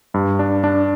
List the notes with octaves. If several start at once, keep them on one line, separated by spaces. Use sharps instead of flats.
G2
D4
D4